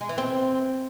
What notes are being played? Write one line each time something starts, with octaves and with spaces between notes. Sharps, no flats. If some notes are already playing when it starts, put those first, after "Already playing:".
G#3
E3
C4